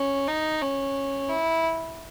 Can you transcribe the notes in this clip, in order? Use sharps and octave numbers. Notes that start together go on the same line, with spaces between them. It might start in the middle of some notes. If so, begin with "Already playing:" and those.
Already playing: C#4
D#4
C#4
E4